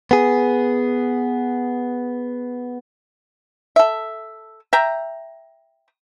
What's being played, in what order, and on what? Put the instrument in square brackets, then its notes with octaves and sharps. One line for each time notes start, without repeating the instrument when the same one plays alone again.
[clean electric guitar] B3 G#4
[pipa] A4 E5
E5 G5 A#5